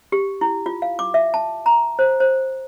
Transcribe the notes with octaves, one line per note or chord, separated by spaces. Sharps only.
G4
E4
F4
F5
D6
E5
A5
A#5
C5
C5